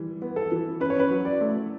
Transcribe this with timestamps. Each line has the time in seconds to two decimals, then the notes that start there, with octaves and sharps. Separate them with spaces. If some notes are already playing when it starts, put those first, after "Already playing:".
Already playing: E3 G3
0.22 B3
0.36 A4
0.51 E3
0.80 C#4 B4
0.90 C#5
1.00 B4
1.11 F#3
1.25 D5
1.41 A3